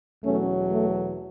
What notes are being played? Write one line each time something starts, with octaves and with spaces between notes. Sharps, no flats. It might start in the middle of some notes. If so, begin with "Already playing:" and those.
E2 B2 F#3 A3 C#4
A3